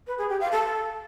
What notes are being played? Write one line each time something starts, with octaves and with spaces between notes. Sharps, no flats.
B4
G#4
G4
F5
A4